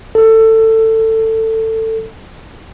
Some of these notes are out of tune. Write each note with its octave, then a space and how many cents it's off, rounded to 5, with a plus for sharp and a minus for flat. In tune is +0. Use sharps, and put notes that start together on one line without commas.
A4 +20